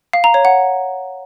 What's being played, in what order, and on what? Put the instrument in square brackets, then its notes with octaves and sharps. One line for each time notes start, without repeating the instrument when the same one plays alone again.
[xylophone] F5
A#5
C#5
F#5